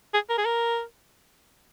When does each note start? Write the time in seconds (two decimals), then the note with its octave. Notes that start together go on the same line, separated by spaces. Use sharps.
0.14 G#4
0.29 A#4
0.38 G#4
0.45 A#4